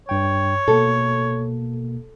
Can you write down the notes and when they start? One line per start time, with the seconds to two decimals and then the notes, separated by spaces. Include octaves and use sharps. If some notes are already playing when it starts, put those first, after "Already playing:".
0.09 G2 C#5 G5
0.68 B2 A#3 A4